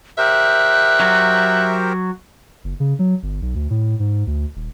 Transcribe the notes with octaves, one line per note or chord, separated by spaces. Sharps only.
G4 A#4 C5 E5 F#6
F#3 F#4
F#1
C#3
F#3
G1
B1
D2
A2
G#2
D2
D#1